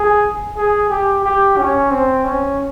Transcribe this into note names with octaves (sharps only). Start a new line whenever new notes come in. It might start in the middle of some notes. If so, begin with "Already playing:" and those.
Already playing: G#4
G#4
G4
G4
C#4
C4
C#4